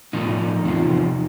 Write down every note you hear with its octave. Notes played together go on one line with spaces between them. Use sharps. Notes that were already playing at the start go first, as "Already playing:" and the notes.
A2 F3 D#4
E2 C3 F3